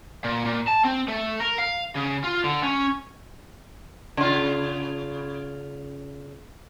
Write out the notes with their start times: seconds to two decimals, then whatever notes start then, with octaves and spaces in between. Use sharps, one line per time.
0.24 A#2
0.45 A#2
0.68 A5
0.85 C4
1.08 A3
1.40 A#4
1.59 F5
1.96 C#3
2.24 F4
2.44 D3
2.63 C#4
4.17 C#3 F4